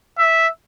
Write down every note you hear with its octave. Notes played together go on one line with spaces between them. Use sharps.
E5